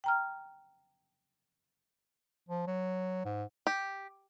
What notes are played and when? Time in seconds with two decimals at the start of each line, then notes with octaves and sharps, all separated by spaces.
0.04 G5 A#5 F6
2.49 F3
2.67 F#3
3.25 G#2
3.67 G4